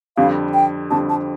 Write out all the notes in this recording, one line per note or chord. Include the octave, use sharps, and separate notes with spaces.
F2 D3 G3 F5
G5
F2 D3 G3 A5
A5